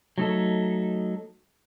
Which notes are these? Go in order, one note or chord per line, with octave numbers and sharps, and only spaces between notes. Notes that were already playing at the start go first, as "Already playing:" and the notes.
F#3 A3 D#4 A4